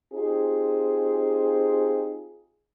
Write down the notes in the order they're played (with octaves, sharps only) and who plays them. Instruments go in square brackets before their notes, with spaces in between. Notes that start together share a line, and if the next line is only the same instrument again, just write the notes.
[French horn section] C4 D#4 F4 G4 G#4